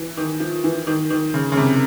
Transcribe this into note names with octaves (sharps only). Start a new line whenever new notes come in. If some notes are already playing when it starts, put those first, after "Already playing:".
Already playing: E3
D#3
F3
E3
D#3
D#3
C#3
C#3
C3